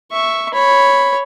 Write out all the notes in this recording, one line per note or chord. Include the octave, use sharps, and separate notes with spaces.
E5 C#6
C#5 B5